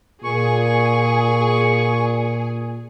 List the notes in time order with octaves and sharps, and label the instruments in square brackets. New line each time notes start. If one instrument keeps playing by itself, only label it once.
[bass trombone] A#2 [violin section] G#4 [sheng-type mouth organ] C#6